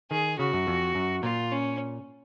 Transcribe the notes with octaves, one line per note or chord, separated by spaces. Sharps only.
D#3 G#4
C#3 F#4
F#2
F2
F#2
A#2 F4
C#4